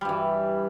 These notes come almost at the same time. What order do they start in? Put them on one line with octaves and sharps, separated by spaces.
G3 G2 E3